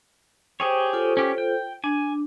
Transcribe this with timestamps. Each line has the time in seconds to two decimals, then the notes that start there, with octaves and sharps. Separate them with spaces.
0.60 G4 G#4 C5 C#5 G5
0.93 F4 A4 C5
1.17 C#4 G4
1.38 G5
1.84 D4 G#5